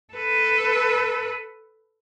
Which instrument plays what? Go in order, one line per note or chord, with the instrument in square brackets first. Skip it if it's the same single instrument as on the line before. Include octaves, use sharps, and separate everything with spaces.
[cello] A4 B4